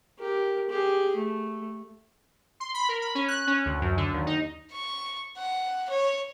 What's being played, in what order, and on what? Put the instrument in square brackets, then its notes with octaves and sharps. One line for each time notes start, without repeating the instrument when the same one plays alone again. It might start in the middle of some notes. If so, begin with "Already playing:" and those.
[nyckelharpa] G4 A#4
G4 G#4
A3
[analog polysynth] C6
B5
A#4
B5
C#4
F#6
C#4
D2
F#2
D3
D#2
D#4
[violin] C#6
F#5
C#5